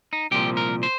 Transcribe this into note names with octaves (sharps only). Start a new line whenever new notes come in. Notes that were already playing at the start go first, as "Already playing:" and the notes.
D#4
C2 A#2 F3 G4
A#4
C5